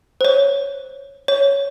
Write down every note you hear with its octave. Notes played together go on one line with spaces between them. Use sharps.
C5
C#5
C#5